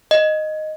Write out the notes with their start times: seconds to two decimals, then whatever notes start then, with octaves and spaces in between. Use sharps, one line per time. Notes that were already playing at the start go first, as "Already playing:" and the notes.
0.11 D#5